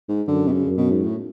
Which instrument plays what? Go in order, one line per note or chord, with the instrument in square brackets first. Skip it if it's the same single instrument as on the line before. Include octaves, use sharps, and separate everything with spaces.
[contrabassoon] G#2
[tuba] F#2 [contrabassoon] D3
[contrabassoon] B2
C#3
[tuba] F#2
[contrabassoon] B2
G#2
A2